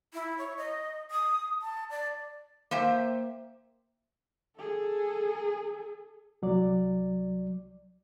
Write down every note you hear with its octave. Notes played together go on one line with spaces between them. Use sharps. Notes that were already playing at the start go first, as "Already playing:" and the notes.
E4
C#5
D#5
D#6
A5
D5
A#3 C5 E5 G5
G#4 A4
C2 F#3 D5